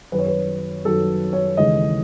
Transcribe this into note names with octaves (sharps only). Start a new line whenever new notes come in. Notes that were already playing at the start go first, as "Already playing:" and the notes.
F#2 D#3 F#3 B4
C#5
B4
F#2 D#3 F#3 A4
C#5
D#2 C#3 E3 G#3 D#5